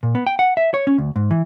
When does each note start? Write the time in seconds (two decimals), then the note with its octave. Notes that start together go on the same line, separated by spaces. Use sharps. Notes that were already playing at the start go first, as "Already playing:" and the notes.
0.03 A#2
0.15 B3
0.27 G5
0.39 F#5
0.57 E5
0.74 C#5
0.87 C#4
0.98 D2
1.16 G#2
1.31 E3